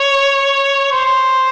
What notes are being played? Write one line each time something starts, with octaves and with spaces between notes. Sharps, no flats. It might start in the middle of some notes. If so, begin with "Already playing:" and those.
Already playing: C#5
C5